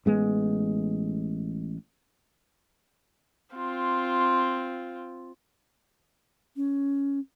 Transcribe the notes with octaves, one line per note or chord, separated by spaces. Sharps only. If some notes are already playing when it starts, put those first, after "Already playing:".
A1 G#3 B3
C4 F4
C#4